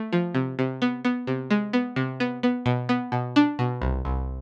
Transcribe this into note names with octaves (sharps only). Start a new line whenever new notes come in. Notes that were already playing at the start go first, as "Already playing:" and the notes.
Already playing: A3
F3
C3
C3
B3
B3
C3
G#3
B3
C3
B3
B3
B2
B3
B2
D4
B2
C2
C2